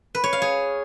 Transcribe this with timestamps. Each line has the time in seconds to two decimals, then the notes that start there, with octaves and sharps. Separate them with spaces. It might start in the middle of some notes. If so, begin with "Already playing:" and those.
0.15 B4
0.24 C#5
0.33 F5
0.42 G#4